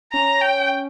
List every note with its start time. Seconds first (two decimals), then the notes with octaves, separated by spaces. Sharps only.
0.13 C#4 A#5
0.42 G5